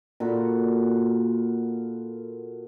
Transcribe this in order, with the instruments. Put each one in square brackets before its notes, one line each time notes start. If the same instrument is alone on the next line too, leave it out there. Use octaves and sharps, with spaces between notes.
[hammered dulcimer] A#2 F#4 A4 B5